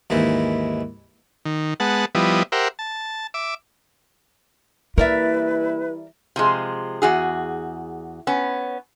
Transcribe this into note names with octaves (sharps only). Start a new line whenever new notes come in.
D#2 G#2 E3 E4
D#3
G#3 B3 F#5 A5
F3 G3 B3 E4 D#5
G4 A#4 C5 E5 F#5
A5
E5 D6
E3 G3 A#3 E4 A#4 B4 D5 E5
C3 F3 G#3
E2 F#4 G#4
B3 C#4